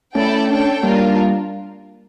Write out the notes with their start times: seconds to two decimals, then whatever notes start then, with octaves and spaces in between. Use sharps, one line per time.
0.15 A3 C#4 E4 A4 D5 G5
0.50 D4 A4 C#5 G5
0.83 G3 A#3 D4 F4 A#4